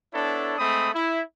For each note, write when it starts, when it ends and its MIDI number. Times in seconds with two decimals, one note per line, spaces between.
0.14 0.54 59
0.14 0.54 62
0.14 0.54 64
0.14 0.54 69
0.14 0.54 73
0.58 0.89 56
0.58 0.89 57
0.58 0.89 60
0.58 0.89 83
0.58 0.89 87
0.93 1.21 64